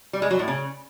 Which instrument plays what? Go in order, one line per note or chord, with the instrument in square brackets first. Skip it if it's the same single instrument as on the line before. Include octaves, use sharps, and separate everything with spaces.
[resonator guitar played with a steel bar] G3
G#3
F#3
A2
C#3